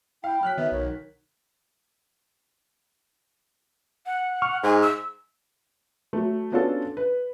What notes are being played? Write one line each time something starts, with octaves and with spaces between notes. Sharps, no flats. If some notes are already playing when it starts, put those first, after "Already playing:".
E4 F5 G5
F#3 F6 F#6 B6
D#3 B3 E5
B1 D#3 C#5
F#5
C#6 F6
G#2 G#5
E6
F#3 A3
B3 C#4 D4 F4 F#4 A4
B4